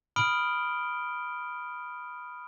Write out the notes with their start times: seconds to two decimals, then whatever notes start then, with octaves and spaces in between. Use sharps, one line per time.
0.16 B5 D#6 F6 D7 G7